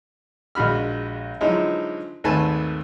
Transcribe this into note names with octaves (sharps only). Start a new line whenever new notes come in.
A#1 G#3 F#4 B5 F6
D3 F3 F#3 G#3 D#4 E4
G#1 D#2 A3 B4 G#5 A5